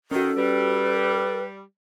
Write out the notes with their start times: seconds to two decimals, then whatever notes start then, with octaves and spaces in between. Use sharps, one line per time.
0.11 D#3 C#4 F#4 A4
0.36 G3 B4